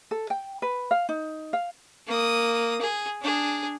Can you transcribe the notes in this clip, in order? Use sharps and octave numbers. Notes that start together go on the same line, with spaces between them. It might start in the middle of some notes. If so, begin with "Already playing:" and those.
A4
G5
B4
F5
D#4
F5
A#3 D#6
G#4
D4 G#4